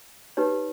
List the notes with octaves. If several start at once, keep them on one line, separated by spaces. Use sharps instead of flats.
D#4 G4 B4 C#5